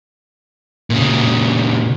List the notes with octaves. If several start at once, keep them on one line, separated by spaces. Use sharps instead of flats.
A#2 C#3